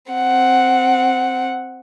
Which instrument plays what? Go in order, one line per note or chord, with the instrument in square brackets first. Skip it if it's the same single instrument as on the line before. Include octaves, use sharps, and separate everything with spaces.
[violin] C4 F#5